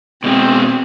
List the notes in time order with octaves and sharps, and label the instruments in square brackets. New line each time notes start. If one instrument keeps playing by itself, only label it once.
[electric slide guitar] B2 G#3 [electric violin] C4